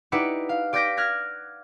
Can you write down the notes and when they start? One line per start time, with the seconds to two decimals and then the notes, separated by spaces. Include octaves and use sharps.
0.12 D#4 E4 G4 B4 D5 F#5
0.49 F5
0.73 G4 D5 D6 G6 A#6 B6
0.97 F6 F#6 G#6 A#6